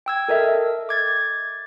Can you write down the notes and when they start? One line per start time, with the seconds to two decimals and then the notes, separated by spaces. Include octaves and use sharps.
0.06 G5 E6 G#6
0.28 A4 A#4 D#5 E5
0.89 D6 G#6 A6